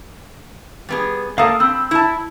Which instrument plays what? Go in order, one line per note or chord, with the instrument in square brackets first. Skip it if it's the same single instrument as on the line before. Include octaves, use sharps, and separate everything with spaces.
[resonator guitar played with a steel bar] G3 B3 G#4
[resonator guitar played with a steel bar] A#3 A4 [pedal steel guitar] F5 D#6
[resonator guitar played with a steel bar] C4 [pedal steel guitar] B5 E6
[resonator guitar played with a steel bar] E4 A5